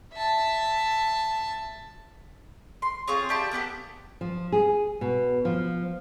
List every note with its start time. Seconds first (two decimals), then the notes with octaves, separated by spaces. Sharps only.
0.14 E5 A5
2.82 C6
3.08 C4 F4 G#4 C#5
3.30 G4 D5 E5 A5
3.51 A#3 B3 G4 A4
4.21 F3
4.52 G#4
5.01 B2
5.45 F3